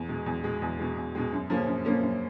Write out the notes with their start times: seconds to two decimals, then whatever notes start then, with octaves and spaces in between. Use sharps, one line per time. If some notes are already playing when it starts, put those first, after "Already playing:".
Already playing: E2
0.09 B2 G#3
0.26 E2
0.44 B2 G#3
0.62 E2
0.79 B2 G#3
0.97 E2
1.15 B2 G#3
1.32 F#2
1.50 C#3 F3 A#3 C#4
1.67 F#2
1.85 C#3 F3 A#3 C#4
2.02 F#2